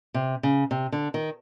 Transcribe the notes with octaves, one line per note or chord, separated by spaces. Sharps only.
C3
C#3
C3
D3
D#3